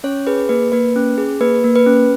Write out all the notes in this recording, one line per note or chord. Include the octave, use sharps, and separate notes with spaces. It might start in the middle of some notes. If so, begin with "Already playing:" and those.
C#4 C#5
G#4 B4
A#3 B4
A#3 B4
C#4
G#4
A#3 B4
A#3
B4
C#4